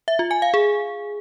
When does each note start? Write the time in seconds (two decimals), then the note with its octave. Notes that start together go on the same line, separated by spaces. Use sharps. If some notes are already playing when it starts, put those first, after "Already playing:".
0.08 E5
0.19 F4
0.31 G#5
0.42 F5
0.54 G#4